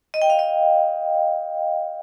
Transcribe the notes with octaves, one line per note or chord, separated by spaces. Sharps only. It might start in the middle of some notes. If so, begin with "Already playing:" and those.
D#5
G5
F5
D#5